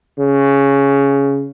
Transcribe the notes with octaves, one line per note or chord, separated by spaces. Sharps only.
C#3